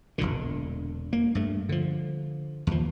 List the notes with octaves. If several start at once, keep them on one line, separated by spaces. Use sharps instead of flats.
E1 A#1 A#2 D3
A#3
G2 A3
D3 F3
D#2 F3